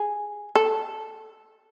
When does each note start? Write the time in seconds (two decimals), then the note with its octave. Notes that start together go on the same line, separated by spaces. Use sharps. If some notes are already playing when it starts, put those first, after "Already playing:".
Already playing: G#4
0.55 A4